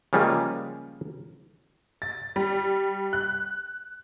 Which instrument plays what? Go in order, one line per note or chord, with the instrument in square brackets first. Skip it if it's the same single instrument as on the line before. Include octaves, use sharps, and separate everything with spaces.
[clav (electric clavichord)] C#3 F3 G3 G#3 A#3 F4
[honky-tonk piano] A6
G3
F#6